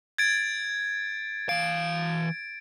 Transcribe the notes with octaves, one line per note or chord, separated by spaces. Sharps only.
G#6 A6 D7
E3 F5 D7